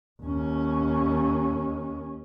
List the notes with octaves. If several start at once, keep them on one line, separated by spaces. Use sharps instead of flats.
D#2 C#4